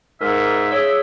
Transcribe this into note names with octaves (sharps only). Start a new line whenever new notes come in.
G#2 A#4 E5
G#4 C#5 E6